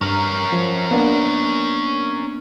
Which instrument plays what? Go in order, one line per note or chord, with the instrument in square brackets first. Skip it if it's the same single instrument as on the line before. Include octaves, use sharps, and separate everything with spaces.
[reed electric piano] G2 A#5 F6 [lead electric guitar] C#4 A#4
[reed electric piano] F3
A#3 B3 D4